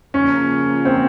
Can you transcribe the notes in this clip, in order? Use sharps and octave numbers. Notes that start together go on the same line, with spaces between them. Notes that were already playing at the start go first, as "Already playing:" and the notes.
C#3 F3 A#3 C#4
C4